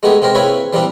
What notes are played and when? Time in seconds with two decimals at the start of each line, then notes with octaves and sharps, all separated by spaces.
0.03 G#3 A3 B3 D#4 G4 G#4
0.22 C3 G#3 G4 A#4 C5
0.35 A#3 C4 E4 G#4 B4 C#5
0.73 E3 G3 A#3 C4 D4